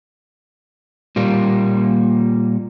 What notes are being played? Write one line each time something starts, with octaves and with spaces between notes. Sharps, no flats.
A#2 G3 A#3